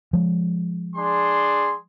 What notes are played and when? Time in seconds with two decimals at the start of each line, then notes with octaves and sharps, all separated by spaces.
0.13 F3 G#3
0.96 D4 G#4 C6